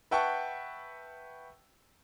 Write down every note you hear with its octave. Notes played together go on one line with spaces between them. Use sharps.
B4 E5 F#5 G5 A5 C#6